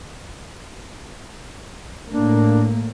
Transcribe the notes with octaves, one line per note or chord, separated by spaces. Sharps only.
A2 A#3 D4